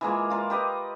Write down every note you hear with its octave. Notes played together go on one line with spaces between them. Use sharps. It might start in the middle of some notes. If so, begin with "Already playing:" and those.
E3 G#3 A#3 F4
F4 A#4 D5
G4 B4 D#5